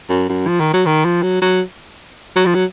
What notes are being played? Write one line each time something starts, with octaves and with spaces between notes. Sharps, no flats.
F#2
F#2
F3
D#3
F#3
D#3
F3
F#3
F#3
F#3
F3
F#3